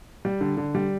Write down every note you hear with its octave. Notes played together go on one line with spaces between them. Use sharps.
G3
D3
D3
G3